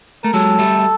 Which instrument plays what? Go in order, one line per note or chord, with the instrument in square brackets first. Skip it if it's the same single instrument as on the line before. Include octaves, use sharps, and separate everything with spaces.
[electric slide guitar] A3 [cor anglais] A#4
[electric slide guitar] F#3 G#3 [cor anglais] A4
[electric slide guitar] G3 A3